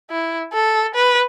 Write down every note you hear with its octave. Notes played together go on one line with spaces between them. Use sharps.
E4
A4
B4